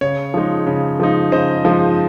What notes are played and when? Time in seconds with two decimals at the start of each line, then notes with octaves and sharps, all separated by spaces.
0.01 C#3 C#5
0.34 F3 G#3 D#4
0.66 C#3
1.00 F3 G#3 D#4
1.32 C#3 C5 D#5
1.65 F3 G#3 D#4